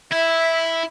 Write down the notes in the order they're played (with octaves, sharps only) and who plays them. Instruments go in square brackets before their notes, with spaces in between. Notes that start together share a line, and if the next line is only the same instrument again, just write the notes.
[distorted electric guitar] E4 [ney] E5